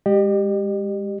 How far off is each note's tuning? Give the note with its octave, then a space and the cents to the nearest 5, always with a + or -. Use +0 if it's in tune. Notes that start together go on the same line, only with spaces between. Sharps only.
G#3 -25 G4 +0 D#5 -45